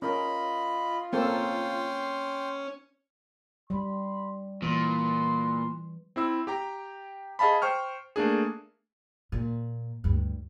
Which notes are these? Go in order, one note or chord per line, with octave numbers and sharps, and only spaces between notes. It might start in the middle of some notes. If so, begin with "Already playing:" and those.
C#4 F4 A#4 D#5 B5
A#3 C4 C#4 A4 G5 C6
G3 B5 C6
A#2 E3 B4 C6
C4 E4 E6
G4 G5 A#5
G#4 D#5 F5 A5 B5
C5 G5 C#6 F6
A3 A#3 D4 G#4
A#2
D2 G2